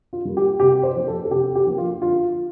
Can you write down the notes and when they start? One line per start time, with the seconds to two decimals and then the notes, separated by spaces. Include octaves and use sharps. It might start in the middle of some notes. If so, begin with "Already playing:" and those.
0.13 F4
0.25 G3 A#3
0.37 G4
0.60 C3 G4
0.83 C5
0.96 F3 A#3
1.08 A4
1.25 A4
1.31 C3 G4
1.55 G4
1.66 F3 A#3
1.78 F4
2.02 D3 F4